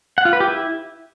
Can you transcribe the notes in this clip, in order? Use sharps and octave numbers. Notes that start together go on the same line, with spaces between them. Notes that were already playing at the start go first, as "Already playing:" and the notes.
F#5
F4
B4
G4
E4